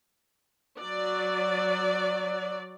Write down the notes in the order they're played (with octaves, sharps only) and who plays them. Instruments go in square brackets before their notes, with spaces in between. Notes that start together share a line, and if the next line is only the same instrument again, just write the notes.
[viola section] F#3 D5